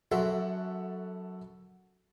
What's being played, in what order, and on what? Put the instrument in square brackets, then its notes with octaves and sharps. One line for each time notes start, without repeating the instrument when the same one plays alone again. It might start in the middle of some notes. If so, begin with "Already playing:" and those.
[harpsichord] F#2 E4 C6 [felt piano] F#4 A4 F#5